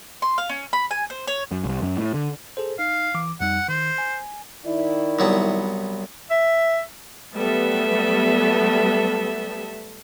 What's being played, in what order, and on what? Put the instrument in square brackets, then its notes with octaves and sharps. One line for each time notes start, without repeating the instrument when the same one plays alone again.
[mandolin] C6
F5
C#4
B5
G#5
C5
C#5
[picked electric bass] F#2
C2
F#2
A2
D3
[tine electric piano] G#4 A4 C5
[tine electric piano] D#4 [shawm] F5
[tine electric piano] E3 D6
[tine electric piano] F2 G3 D#4 [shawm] F#5
[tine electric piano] D#3 [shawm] C5
[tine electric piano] G#5
[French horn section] D#3 E4 D5
[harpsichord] C2 F#3 B3
[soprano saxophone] E5
[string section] F#3 G3 B3 [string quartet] A3 A4 E5